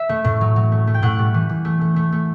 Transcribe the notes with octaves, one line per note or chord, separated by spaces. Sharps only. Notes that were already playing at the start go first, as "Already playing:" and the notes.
Already playing: E5
A3
A2
F#3
F#3
A3
A3
G5
A2 F#5
G3
E3
E3
A3
A3
A3
A3